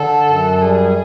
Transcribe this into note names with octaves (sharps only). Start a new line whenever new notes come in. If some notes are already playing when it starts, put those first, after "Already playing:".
Already playing: D3 A4
F#2
G3 G#4